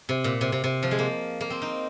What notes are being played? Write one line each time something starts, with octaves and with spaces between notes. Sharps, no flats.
C3
A#2
C3
C3
C3
F3
G#3
A#3
A#3
C4
D#4